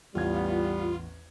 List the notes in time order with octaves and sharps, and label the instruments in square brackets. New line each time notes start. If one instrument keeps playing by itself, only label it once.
[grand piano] A1 E2 G#6 [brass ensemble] G3 B3 [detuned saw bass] F4